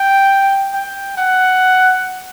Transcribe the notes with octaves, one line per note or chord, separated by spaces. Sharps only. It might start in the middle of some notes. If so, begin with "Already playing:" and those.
Already playing: G5
G5
F#5